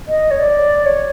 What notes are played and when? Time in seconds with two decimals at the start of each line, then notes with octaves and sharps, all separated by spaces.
0.08 D#5
0.31 C#5
0.40 D5
0.86 C#5